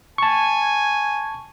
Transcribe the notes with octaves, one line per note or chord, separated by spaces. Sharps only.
G#5 A5 C#6